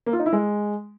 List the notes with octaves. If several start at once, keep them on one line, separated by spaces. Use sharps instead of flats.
A#3
F4
D#4
E4
G#3